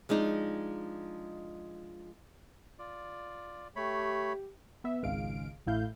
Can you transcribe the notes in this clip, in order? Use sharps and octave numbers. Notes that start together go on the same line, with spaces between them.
F3 G#3 D4 D#4
F4 D5
A3 G4 C#5 B5
B3 E5
G#1 C#2 G#3 F5 D7
A1 A2 E4 F5 G6